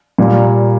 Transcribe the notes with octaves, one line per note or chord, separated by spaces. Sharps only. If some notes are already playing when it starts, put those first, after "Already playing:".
A#2 G3 A#3